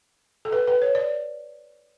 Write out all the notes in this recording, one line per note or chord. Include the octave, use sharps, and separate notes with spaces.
A4
B4
B4
C#5
D5